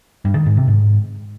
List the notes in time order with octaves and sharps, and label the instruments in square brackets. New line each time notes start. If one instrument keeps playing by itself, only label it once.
[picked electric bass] G2
D#3
G#2
C3
G#2